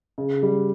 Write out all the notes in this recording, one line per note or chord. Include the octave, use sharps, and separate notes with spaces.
C#3
G3